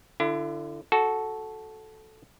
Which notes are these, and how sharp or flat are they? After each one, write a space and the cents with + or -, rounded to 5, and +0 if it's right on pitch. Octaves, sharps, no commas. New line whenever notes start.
D3 +15 E4 +40
F#4 +0 A4 -10